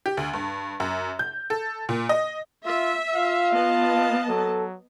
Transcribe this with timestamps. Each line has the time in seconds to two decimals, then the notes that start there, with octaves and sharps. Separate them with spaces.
0.06 G4
0.17 D2
0.33 G2
0.80 F#2
1.19 G6
1.50 A4
1.89 A#2
2.09 D#5
2.66 F4 E5
3.15 F4 F5
3.53 B3 D#5 A5
4.29 F#3 A4